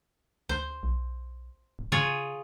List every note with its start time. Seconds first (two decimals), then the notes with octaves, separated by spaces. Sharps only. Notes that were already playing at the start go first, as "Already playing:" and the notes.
0.49 D2 C5
0.83 B1
1.79 D1
1.92 C#3 F4 G#4 C#5